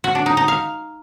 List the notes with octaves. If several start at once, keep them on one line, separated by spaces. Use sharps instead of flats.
F#4
D4
D#4
D#4
F5